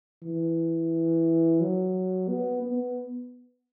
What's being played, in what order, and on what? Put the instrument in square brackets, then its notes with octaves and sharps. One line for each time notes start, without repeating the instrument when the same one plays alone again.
[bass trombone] E3
F#3
B3
B3